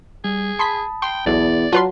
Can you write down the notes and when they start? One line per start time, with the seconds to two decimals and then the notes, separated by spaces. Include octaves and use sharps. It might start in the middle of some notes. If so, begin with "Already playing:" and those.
0.24 G3 G#4
0.59 A5 B5 C6 D#6 B6
1.02 G5 C6
1.26 B1 E2 D5
1.73 F#3 F4 B4 A5 C6